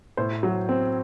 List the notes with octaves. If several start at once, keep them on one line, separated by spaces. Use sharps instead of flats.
A2 C5
F#3
C4